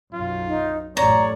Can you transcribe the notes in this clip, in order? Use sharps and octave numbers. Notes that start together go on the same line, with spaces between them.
B1 F#2 F4
D#4
A1 F#2 A2 C#5 D5 A#5